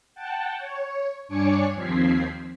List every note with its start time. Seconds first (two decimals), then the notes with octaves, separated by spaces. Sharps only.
0.15 F#5 G5 A5
0.58 C#5
1.28 G2 D4 C#5 G#5 D6 C#7
1.74 D#2 F3 C4 G#6 B6 C7